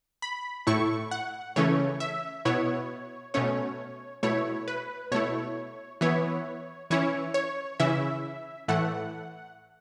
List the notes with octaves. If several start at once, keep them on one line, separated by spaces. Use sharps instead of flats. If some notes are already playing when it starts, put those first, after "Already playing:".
B5
A2 A3 E4 C#6
F#5
C#3 E3 A3 C#4 C#5
E5
B2 B3 E4 C#5
B2 A3 C#4 C#5
B2 A3 E4 C#5
B4
B2 A3 E4 C#5
E3 B3 E4 C#5
E3 C#4 E4 C#5
C#5
C#3 E3 C#4 E4 E5
A2 E3 A3 F#5